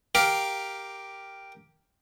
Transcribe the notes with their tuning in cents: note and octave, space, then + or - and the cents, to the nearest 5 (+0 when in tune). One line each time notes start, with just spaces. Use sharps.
G4 +0 A#4 +0 F5 +0